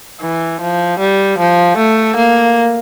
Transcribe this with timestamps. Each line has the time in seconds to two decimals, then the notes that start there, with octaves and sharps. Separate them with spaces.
0.21 E3
0.61 F3
0.99 G3
1.39 F3
1.77 A3
2.16 A#3